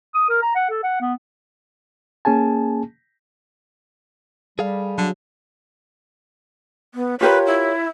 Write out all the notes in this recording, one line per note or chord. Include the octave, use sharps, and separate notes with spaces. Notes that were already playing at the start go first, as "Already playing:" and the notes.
D#6
A#4
A#5
F#5
A4
F#5
B3
A#3 C#4 G#4 G#5 A5
G3 G#4 A4 F5
D3 F#3
B3
F4 G4 A#4 B4 C#5
E4